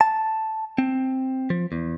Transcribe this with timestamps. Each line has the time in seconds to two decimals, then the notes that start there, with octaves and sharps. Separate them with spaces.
0.01 A5
0.78 C4
1.50 F3
1.72 E2